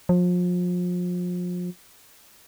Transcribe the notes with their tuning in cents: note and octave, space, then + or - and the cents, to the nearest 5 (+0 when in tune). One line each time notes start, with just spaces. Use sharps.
F3 +35